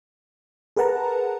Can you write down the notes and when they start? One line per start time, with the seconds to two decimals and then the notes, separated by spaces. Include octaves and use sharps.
0.77 G#4 A#4 B4 F#5 A5 A#5